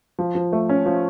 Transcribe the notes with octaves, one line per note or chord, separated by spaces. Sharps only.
F3
F3
A3
C#4
F3